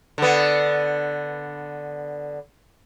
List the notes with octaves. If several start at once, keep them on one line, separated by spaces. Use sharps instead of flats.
D3 B3